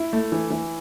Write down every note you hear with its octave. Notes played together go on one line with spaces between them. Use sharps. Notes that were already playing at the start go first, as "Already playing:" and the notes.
Already playing: E4
A3
E3
E3